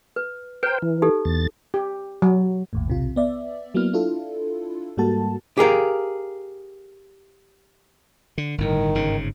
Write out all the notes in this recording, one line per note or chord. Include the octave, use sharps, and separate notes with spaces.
B4
B4 C5 G5 A#5
E3
D#4 G4 A4
E2 A6
G4
F#3
G#1 D#2 A2
B1 C3 F4
B3 D5 E5
F#3 A#3 B3 E4 F6
D4 E4 F4 A4
G#2 G3 A#3 F#4 A4 A5
G4 G#4 A#4 F5
D3
G1 A2 D#3
G1 G#2 C#3